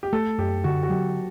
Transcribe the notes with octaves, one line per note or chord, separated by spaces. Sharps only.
G4
A3 A4
F#2 G4
D3 F#4
F#4
F#3 G4